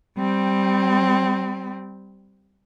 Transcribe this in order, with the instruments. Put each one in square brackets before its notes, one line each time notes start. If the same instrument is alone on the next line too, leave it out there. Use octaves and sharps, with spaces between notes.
[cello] G3 C4